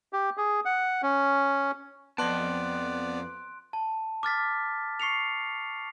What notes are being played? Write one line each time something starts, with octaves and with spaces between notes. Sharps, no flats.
G4
G#4
F#5
C#4
F2 B3 D5 A5 C6 F#6 D7
A5
D6 F6 A6 B6
C#6 C7 C#7 F7